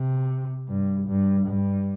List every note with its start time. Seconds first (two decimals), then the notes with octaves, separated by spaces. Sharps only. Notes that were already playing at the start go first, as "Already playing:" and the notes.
Already playing: C3
0.69 G2
1.07 G2
1.47 G2